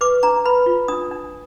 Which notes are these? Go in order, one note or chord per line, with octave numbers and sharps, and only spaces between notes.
B4 D6
D4 A#5
B4 B5
F4
D4 D#6
D4